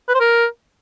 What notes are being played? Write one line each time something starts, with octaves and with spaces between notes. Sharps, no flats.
B4
C5
A#4